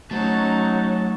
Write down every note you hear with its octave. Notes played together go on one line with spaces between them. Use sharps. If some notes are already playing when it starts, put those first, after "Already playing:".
F#3 A3 C#4 D#4 F#4 A5